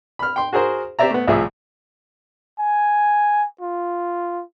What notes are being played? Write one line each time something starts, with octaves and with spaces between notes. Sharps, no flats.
B5 F6
G5 C6
F#4 G#4 A#4 C5
C4 G4 C5 D5 E5 A#5
A3 B3
C2 A2 F3 G#4 E5
G#5
F4